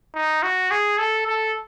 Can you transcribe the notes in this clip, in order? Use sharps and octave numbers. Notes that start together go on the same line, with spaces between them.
D#4
F#4
G#4
A4
A4